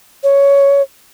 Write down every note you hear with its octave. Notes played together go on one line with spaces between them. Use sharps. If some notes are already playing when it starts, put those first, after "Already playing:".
C#5